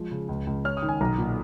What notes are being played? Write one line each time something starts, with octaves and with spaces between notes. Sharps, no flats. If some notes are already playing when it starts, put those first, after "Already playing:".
Already playing: F3 G#3
C#3
C#2
C#2
C#4 F6
D#6
D#3
G#5
B1 A#5
A#2